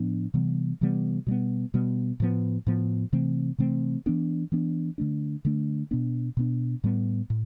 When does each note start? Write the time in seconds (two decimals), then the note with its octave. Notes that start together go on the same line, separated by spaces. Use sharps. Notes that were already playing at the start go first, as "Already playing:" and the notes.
Already playing: A2 F3 B3 D4
0.34 C3 E3 G3 B3
0.81 C3 E3 G3 B3
1.27 B2 G3 B3
1.74 B2 G3 B3
2.20 A2 F3 B3
2.67 A2 F3 B3
3.13 C3 E3 A3 C4
3.58 C3 E3 A3 C4
4.06 E3 B3 D4
4.52 E3 B3 D4
4.98 D3 A3 D4
5.45 D3 A3 D4
5.91 B2 B3 D4
6.37 B2 B3 D4
6.84 A2 G3 B3
7.30 A2